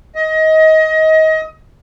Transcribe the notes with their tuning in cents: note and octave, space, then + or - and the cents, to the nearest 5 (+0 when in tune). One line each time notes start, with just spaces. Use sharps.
D#5 +25